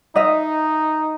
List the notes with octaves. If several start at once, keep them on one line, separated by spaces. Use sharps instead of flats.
D#4 D#5 E5